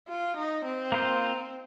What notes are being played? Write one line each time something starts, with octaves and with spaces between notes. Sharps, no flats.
F4
D#4
C4
A#3 F4 C5